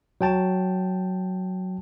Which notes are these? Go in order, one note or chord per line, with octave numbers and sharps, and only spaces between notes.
F#3 G5 A5